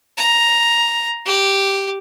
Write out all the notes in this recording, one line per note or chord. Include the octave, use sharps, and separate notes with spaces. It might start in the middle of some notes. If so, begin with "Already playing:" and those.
A#5
G4